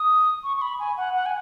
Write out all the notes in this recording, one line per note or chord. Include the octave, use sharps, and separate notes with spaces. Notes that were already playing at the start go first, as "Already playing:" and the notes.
Already playing: D#6
C#6
C#6
B5
G#5
F#5
F#5
G#5